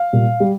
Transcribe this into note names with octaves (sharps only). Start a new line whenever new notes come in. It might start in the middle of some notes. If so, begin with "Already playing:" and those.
Already playing: F5
A#2 G3
G3